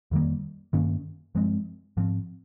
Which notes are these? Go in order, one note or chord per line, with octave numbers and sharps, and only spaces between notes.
F2 D#3 G3 A#3
G2 D#3 A#3 C#4
G2 F3 G#3 C4
G#2 F3 C4